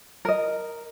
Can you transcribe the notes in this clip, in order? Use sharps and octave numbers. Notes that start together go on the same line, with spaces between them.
A#4 D#5